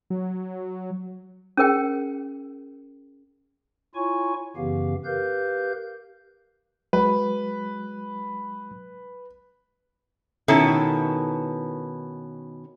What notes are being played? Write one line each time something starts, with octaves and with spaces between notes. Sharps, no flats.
F#3
C#4 G#4 A#4 G5
E4 F4 C#5 G#5 C#6
F#2 C#3 E3 B3 G4 F5
G4 A#4 B4 F5 G6
F#3 G#3 B4
B2 D#3 B3 C#4 E4 A4